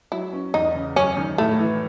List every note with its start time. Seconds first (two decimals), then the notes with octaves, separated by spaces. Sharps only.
0.12 F#3 E4
0.33 C#4
0.54 E2 D#4
0.75 C#3
0.96 F#2 C#4
1.17 D#3
1.38 A2 A3
1.59 E3